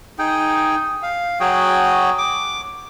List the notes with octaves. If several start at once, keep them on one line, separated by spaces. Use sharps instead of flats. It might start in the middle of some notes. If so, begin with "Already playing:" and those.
D#4 G#4 G5
F5
F#3 F#4 G#4 G5
D6